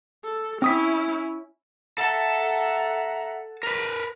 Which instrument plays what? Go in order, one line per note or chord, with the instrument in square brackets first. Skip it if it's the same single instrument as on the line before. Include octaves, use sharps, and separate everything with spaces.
[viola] A4
[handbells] C4 D#6 B6 [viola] C#4 E4
[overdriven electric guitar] A4 A5 [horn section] E5 A#5 [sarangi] F#5
[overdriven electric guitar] A#4 B4